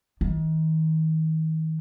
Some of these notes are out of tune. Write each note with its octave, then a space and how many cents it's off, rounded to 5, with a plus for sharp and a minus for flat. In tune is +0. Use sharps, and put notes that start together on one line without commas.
D#3 +35